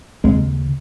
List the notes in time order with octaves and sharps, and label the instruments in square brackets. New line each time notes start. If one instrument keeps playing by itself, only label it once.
[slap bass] D#2 C#3 G#3 C4